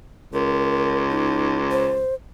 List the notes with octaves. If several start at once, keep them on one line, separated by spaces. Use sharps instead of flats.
C#2 A#4
D#4
C5